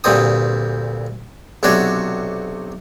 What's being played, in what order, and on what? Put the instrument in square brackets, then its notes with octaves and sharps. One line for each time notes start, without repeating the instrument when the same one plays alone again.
[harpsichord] D2 G2 A#2 C4 D#6
B1 C3 D4 F#4 C#5